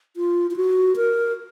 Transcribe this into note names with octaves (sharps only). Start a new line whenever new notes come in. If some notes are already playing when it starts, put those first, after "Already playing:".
F4
F4
F#4
A#4